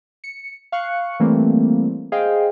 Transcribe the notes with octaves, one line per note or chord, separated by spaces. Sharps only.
C#7
F5 C#6 F#6 C#7
E3 G3 A3 A#3 C4
G#4 C5 D#5 F5 G5